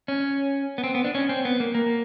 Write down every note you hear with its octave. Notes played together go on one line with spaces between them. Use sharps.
C#4
B3
C4
B3
D4
C#4
C4
B3
A#3
A#3